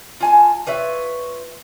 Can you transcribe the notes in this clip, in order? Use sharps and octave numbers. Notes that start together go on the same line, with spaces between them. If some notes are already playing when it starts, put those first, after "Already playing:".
F4 G#5 A5
F4 B4 C#5 E5